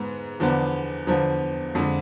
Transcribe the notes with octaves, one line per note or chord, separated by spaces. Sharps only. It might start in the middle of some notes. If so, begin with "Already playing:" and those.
Already playing: G#2 G#3 B3
E2 D3 F3 B3
E2 D3 F3 B3
F2 D3 G#3